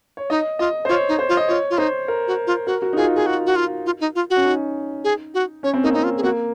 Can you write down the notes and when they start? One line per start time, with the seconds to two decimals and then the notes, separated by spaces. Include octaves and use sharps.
0.17 C#5
0.30 D#4 D#5
0.59 F4 D#5
0.85 C5
0.89 F4 C#5
1.09 D#4
1.19 C5
1.29 F4
1.37 D#5
1.48 F4 C#5
1.70 F4
1.78 D#4 C5
2.08 A#4
2.27 F#4
2.47 F4
2.67 F#4 A#4
2.82 F#4
2.93 D#4
2.97 F4 G#4
3.15 G#4
3.26 F#4
3.46 F#4
3.56 F4
3.86 F4
4.01 D#4
4.15 F4
4.30 F#4
4.36 C#4
4.45 D#4
5.04 G#4
5.34 F#4
5.63 C#4 C#5
5.74 C4
5.83 A#3 D#4
5.94 C4 D#4
6.04 F4
6.17 G#4
6.23 A#3 F#4